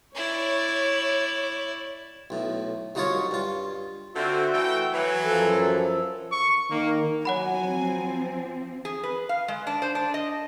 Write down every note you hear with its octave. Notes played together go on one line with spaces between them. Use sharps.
E4 C#5 D5
B1 A2
C2 F#3 D#4 F4 A#4 C#5
G2 F4
D3 C4 F4 F#4 E5
E3 A3 G5
E3 F#3
F#2 F3 A4
C#6
D#3 A#3
F#3 C#5 F#5 G#5 B5
F3 C4
G#4
B4
F5
G#3
D4
C5
D4
D#5